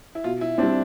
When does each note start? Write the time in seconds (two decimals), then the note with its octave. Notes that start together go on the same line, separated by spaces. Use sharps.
0.15 E4
0.24 B2 F4
0.41 E4
0.58 C4 D4
0.63 G3